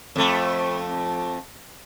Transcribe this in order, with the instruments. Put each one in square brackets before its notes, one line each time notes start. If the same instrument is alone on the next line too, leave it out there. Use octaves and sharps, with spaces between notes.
[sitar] F2 A3